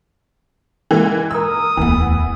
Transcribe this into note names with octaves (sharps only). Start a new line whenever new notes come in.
E3 G#3 A#3
A#4 D#6 E6
D1 E2 E3 B3